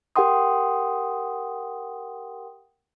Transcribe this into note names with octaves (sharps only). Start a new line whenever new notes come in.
G4 A#4 F#5 G5 C6 D#6